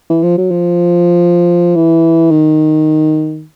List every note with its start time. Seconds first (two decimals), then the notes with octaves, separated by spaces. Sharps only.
0.10 E3
0.23 F3
0.38 F#3
0.51 F3
1.75 E3
2.31 D#3